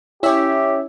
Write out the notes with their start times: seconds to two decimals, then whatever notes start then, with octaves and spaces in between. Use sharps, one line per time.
0.23 C#4 E4 G4 C#5 E5